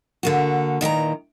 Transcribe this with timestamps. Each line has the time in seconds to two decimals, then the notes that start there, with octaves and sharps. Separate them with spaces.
0.23 D3 A#3 F#4
0.81 A#2 D#3 E3 A#5